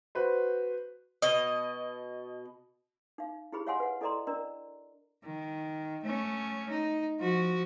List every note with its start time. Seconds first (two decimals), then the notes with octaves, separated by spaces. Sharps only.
0.15 F#4 B4 C5
1.22 B2 D#5
3.18 D#4 F5
3.52 E4 G4 G#4 B5
3.67 C#5 D#5 F5 F#5 G#5 C6
3.80 B4 F#5
4.01 E4 A4 D5 D#5 A#5 C6
4.27 D4 A#4 D5 D#5 A#5
5.24 D#3
6.04 A3 C#4
6.70 D#4
7.19 F3 F#4